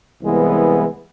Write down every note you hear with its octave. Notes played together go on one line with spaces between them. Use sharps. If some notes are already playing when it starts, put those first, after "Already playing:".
C2 E3 G#3 B3